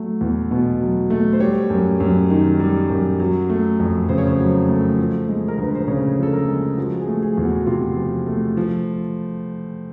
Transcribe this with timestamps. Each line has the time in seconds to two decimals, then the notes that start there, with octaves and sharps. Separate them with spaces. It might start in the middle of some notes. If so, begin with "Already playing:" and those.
Already playing: F#3 A3
0.21 E2
0.51 B2
0.81 F#3
1.10 A3
1.33 C5
1.40 G3 C#5
1.70 F#2
2.00 F#2
2.30 D#3
2.60 G3
2.90 F#2
3.20 F#3
3.50 A3
3.79 F2
4.09 C#3 C5
4.18 C#5
4.27 C5
4.39 F#3
4.69 A3
4.98 F3
5.29 G#3
5.48 A#4
5.58 D2 B4
5.75 C5
5.88 C#3 C#5
6.18 F3 A4
6.33 A#4
6.48 G#3
6.77 F3 F#4
7.00 G#4
7.07 A3
7.23 G#4
7.38 E2
7.45 F#4
7.67 C3 F4
7.97 F3
8.27 A3
8.57 F3